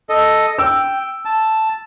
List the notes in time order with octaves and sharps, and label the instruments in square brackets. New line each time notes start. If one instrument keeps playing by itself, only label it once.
[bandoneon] A4 D#5
[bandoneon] G5 [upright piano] E6
[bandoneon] A5